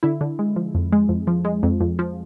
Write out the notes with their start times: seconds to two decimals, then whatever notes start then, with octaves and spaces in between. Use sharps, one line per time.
0.03 D3 E4
0.21 D3
0.39 G#3
0.56 F3
0.75 F2
0.92 G#3
1.09 F2
1.27 F3
1.45 G#3
1.63 F2
1.81 F2
1.99 F3